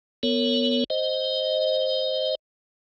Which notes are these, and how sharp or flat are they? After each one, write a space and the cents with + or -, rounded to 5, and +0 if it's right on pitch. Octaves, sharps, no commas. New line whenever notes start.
B3 +0 A#4 -35 C#5 +0
C5 +0 D#5 +0